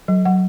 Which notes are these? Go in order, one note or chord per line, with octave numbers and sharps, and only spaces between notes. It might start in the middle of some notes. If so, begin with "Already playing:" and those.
F#3
F#3 F#5